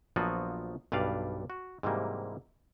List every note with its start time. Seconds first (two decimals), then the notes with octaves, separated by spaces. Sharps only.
0.16 A#1 F3 F#3 B3 F4 F#4
0.92 B1 G2 B4 D5 F5
1.50 F#4
1.83 G#2 C3 E3 F#3 G3 A#3